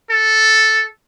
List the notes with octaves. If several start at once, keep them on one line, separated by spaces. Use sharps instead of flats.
A4